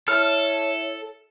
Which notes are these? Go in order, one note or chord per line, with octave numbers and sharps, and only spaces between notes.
E4 A4 C#5 E5 A5 F6